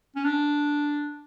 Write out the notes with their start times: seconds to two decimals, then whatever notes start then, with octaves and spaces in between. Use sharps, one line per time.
0.16 C#4
0.24 D4